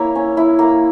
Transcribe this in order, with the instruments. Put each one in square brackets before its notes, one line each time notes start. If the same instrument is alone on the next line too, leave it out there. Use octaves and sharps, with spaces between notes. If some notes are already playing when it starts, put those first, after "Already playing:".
Already playing: [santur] A#3 E4 C#5
C#4
E4
A#3